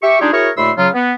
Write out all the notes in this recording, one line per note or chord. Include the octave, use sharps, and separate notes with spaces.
G4 E5 C#6
G3 D4 D#4 F4 G4 G#4
E4 F#4 G#4 A#4 C#5 C#6
D#2 A#2 A3 B5 C6 E6
C#3 F#3 F4
B3